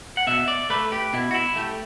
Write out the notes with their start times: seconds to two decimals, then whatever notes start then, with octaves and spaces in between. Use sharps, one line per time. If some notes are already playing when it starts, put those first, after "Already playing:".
0.17 F#5
0.27 B2 E5
0.48 D5
0.70 A3 B4
0.92 G4
1.13 B2 E4
1.31 F#4
1.34 E4
1.56 A3 G4